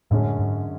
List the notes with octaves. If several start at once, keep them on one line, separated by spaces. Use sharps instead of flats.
F#2 A2 D3 G#3 C#4
G#2